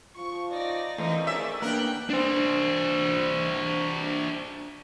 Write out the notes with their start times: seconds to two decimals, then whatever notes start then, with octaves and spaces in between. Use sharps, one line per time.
0.16 F3 F4 C#6
0.52 D#4 D5 A#6
0.98 D2 E3 A3 A#3 C4 D#4
1.27 D#3 G#3 A#3 C#4 D5 E5
1.62 D#3 A#3 B3 D4 A#4 G5 F#6
2.10 D4 C5